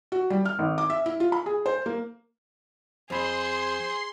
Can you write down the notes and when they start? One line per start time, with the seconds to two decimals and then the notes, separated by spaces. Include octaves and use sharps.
0.12 F#4
0.30 G3
0.45 F6
0.59 G#1
0.78 D6
0.90 E5
1.06 E4
1.20 F4
1.32 B5
1.46 G#4
1.66 C5
1.86 A#3
3.10 F2 G#4 C5 B5 C6